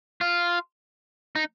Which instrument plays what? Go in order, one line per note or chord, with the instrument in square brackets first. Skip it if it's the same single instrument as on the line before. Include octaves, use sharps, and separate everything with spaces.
[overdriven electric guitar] F4
D#4